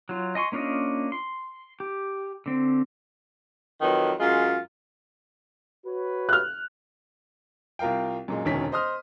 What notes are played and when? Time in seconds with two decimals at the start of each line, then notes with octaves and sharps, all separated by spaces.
0.09 F#3 F4
0.35 D#5 G#5 C6 C#6
0.52 A#3 C#4 D4 F4 D#5
1.12 C6
1.80 G4
2.46 D3 C4
3.81 F2 D#3 F#3 B4
4.20 F#2 G#3 F4
5.86 F#4 B4 C#5
6.29 F6 F#6
7.79 C2 F4 A#4 F5 G5
8.28 F#2 A#2 G#3
8.45 E1 D2 D#3 C#4 B6
8.72 C5 D#5 C6 D#6 F6